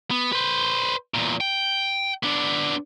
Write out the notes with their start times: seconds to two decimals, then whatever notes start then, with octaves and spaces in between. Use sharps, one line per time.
0.11 B3
0.33 B4 C5
1.14 E2 A#2
1.41 G5
2.23 B3 D4